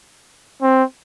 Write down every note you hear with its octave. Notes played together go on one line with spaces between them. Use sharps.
C4